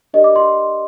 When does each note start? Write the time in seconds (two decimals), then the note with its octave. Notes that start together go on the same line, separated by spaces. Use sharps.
0.14 D4 G4 A#4 D5 D#5
0.24 D6
0.36 C6